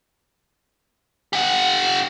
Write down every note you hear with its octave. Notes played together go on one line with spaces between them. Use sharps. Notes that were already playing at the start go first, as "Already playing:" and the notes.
G4 F#5